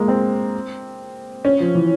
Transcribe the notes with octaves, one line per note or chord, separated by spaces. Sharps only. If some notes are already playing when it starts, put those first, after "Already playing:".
Already playing: G#3 A#3
C4
C#4
F3
E3